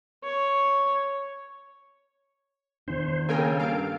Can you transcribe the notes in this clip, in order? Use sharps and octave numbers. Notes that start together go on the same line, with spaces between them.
C#5
E2 D#3 D4 C5
C#3 A#3 A4 A#4 G5 G#5
G2 F5 D7